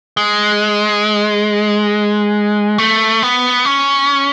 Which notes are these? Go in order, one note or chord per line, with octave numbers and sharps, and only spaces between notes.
G#3
A3
B3
C#4